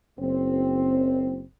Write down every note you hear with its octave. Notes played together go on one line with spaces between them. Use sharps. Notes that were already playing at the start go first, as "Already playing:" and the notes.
F#1 C4